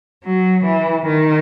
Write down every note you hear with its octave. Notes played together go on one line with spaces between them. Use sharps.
F#3
E3
D#3